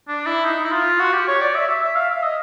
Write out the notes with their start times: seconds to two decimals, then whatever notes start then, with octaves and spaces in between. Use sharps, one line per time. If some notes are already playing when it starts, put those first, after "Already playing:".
0.08 D4
0.26 E4
0.45 D#4
0.65 E4
0.72 F4
1.00 F#4
1.13 G4
1.27 C#5
1.41 D5
1.55 E5
1.68 E5
1.82 E5
1.95 F5
2.09 E5
2.22 D#5